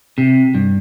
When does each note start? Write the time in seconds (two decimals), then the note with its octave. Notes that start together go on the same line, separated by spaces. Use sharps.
0.18 C3
0.54 G2